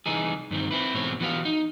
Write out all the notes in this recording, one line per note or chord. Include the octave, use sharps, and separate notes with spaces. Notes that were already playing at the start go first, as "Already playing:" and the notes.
C2 E3 D#4 G#4
G2 D#3 C4
C4 E4 B4
G#2 B2 E3 C4 C#5
E3 B3 F#4 G4 F5
D#4